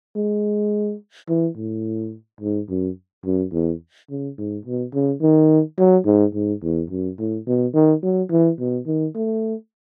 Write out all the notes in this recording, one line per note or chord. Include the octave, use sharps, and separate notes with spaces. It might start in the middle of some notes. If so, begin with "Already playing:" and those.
G#3
E3
A2
G#2
F#2
F#2
E2
C#3
G#2
B2
C#3
D#3
F#3
G#2
G#2
E2
F#2
A2
B2
D#3
F#3
E3
B2
D#3
A3